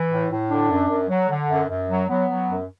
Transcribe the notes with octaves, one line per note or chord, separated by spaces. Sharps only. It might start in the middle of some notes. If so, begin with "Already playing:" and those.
Already playing: E3
A2
A2
D3 D4
F#2
F#2
F#3
D3
F#2
F#2
F#3
F#3 B3
F#3
F#2